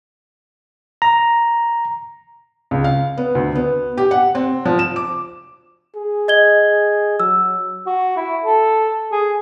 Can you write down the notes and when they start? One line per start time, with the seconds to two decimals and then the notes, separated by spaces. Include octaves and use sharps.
1.02 A#5
2.71 C#2
2.84 F5
3.17 B3
3.35 D2
3.55 B3
3.97 G4
4.11 F#5
4.35 C4
4.65 F3
4.79 E7
4.96 D6
5.96 G#4
6.28 D#5 G#6 G7
7.20 F#3 E6
7.86 F#4
8.17 E4
8.44 A4
9.12 G#4